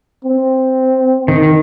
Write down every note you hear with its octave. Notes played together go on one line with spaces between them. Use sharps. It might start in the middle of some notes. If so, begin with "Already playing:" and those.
C4
D#3